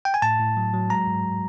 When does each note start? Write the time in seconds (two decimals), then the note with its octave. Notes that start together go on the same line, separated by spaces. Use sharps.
0.05 G5
0.14 G#5
0.22 A2 A5
0.39 A2
0.57 F#3
0.74 F#3
0.90 G#3 A#5
1.07 G#2